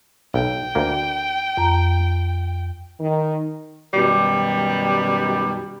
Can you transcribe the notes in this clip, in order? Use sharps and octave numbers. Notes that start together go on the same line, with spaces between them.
B1 G5
D2 A#3
F2 A#5
D#3
F#2 B2 D#3 G3